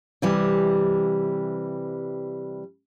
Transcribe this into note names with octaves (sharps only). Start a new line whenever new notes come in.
C3 E3 G3